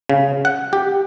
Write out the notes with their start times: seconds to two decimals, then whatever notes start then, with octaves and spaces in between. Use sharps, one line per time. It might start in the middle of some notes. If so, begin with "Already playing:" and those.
0.09 C#3
0.45 F#5
0.73 G4